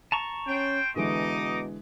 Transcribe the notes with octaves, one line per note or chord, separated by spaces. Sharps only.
A5 A#5 C#6
C#4 C5 G5
B2 D3 E3 G#3 D#4 D#5 D6